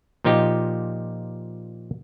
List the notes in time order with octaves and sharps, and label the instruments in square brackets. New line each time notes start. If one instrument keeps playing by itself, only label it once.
[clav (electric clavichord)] A#2 F3 D#4 G4